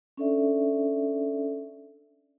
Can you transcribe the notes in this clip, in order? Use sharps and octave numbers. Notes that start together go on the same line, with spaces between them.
C#4 D4 A4 D5 E5